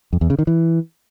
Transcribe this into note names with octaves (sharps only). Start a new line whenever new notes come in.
F2
E2
C#3
D#3
E3